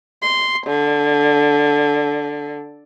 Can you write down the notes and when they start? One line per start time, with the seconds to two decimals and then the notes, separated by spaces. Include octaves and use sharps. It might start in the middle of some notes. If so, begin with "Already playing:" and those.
0.23 C6
0.67 D3